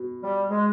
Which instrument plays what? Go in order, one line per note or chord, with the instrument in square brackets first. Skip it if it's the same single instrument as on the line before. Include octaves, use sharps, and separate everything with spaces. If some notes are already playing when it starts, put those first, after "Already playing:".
Already playing: [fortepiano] B2
[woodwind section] G3
G#3